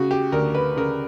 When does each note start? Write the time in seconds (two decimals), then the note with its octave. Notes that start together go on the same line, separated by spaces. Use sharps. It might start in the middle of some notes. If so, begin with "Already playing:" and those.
Already playing: C#3 F#4
0.11 G4
0.32 D2 A#4
0.55 B4
0.77 C#3 A#4